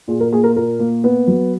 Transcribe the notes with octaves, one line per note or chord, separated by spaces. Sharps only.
A#2 G#4
A#4
A#3 G#4
A#4
A#2 A#4
A#3
B3
F#3